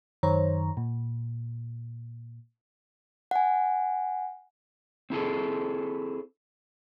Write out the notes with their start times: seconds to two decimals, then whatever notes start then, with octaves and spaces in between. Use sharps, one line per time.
0.23 F#2 D#3 C5 C#5 A#5
0.77 A#2
3.31 F#5 G#5
5.10 C4 E4 G#4 A4